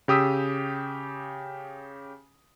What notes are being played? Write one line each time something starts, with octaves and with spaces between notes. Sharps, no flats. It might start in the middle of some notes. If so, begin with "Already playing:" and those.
C#3 G4 D#6 E6 B6